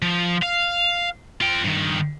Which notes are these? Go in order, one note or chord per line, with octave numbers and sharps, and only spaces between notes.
F3
F5
F4 G5
G2 D#3